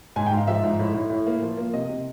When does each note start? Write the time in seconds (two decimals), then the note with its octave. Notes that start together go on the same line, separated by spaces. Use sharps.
0.16 G#2 G#5
0.26 G5
0.32 G#2
0.37 F5
0.47 F3 E5
0.64 G#2
0.79 A2
0.94 A2
1.10 A2
1.27 A#3
1.42 F3
1.57 A#3
1.73 C3 D#5
1.89 C3